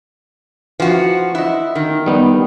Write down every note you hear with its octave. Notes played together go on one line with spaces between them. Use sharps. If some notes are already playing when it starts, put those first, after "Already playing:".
E3 F3 F#4
E4 D#5 F#5
D#3
G3 B3 D#4